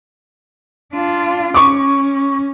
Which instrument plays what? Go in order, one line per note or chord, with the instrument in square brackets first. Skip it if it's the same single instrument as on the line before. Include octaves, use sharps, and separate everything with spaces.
[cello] D4 F4
[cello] C#4 [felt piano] C#6 D6